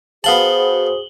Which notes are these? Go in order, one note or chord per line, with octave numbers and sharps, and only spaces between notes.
B3 F#4 G#4 C5 F5 A5 F#7 G7